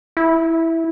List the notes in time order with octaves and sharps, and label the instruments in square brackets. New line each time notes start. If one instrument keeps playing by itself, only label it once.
[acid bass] E4